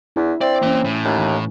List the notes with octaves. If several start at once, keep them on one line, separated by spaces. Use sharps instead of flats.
E2 D4 E4
C4 D5 E5
E3 A#3 C#4 C6
A2
D#2
E3